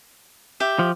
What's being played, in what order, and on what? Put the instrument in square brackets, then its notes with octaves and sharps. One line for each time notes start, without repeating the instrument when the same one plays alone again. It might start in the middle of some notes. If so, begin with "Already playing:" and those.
[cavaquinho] G4 E5
[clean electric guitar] F3